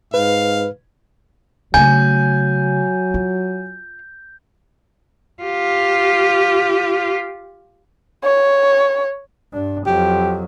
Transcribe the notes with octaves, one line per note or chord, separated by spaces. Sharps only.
G#2 B4 F5
C#3 F#3 A3 G#5 G6
F4
F4 G4
C#5
G2 D4
F2 F#3 G4